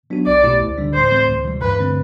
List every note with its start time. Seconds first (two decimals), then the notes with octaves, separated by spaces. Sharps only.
0.10 F#3 B3 D4 F#4
0.26 B1 D5
0.43 B2 A3 E4 G4
0.61 D2
0.78 D3 G3 D4
0.94 A2 C5
1.11 E3 A3 C4
1.28 D2
1.45 C3 E3 G3
1.61 G2 B4
1.79 D3 A3 C4